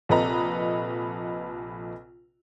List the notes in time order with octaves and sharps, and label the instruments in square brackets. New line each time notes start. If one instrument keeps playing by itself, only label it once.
[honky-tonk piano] A#1 C3 A4 B4 D#5 A#5